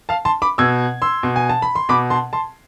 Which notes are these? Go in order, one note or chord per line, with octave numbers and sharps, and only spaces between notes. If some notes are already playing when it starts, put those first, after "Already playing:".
F5 A5
A5 C6
B5 D6
B2 E6 G#6
C6 E6
B2
G#5
A5
B5
C6
B2 B5 D6
A5 C6
A5 C6